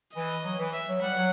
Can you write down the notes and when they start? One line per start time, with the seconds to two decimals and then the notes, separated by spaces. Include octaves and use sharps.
0.15 E3 D#5
0.45 F#3
0.59 E3
0.73 E5
0.88 F#3
1.01 G3 F#5
1.16 F#3